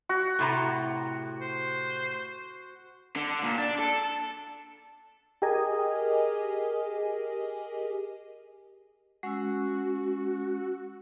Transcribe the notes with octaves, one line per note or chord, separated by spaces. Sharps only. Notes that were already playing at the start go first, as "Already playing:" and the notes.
F#4
A2 C3 A#5
C5
D3
A#2
D4
A4
G4 G#4 A#4 D#5 G#5
G#3 C#4 F#4 E6